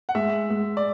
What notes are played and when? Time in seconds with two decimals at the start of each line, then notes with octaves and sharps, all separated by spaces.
0.09 F#5
0.15 G#3 E5
0.50 G#3
0.77 D5